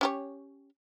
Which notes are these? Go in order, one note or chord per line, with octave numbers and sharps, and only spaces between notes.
C#4 G4 C#5